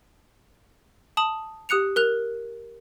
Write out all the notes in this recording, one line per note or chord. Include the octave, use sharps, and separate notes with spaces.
A5 D#6 F#7
G4 D#6 F#6 C#7 F7
A#4 F#6 F7